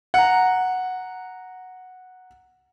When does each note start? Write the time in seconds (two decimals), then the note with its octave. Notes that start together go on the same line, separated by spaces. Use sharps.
0.14 F#5 A#5